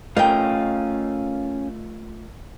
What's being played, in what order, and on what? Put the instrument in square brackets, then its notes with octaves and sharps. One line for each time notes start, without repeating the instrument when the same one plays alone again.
[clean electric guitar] A3 F4 D#5 [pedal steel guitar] C#4 F5 [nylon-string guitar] A#4 G5